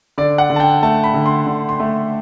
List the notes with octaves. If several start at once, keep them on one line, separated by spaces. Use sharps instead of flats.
D3 D5
F#5
D3
A5
G5
A3 A5
B5
D3
C6
D3
C6
A3